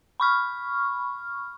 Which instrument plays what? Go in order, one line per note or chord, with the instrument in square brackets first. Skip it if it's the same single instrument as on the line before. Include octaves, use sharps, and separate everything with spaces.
[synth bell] B5 C#6 F6